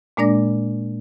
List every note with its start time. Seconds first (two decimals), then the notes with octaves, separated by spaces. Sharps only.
0.17 A#2 G#3 A#3 D4 D5 A#6